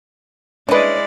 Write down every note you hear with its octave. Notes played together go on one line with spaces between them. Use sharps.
G#3 C#4 D4 E4 B4 D5 D#5